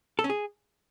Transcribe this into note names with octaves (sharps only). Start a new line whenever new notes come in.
A4
C#4
G#4